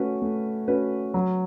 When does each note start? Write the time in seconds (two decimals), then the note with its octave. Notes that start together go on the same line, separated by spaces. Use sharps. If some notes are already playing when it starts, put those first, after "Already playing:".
Already playing: A3 C#4 F#4 B4
0.22 A3
0.68 C#4 F#4 B4
1.14 F#3